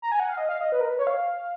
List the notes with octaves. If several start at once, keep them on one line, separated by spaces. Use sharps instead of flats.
A#5
G#5
F#5
F5
D#5
F5
D#5
B4
A#4
B4
C#5
F5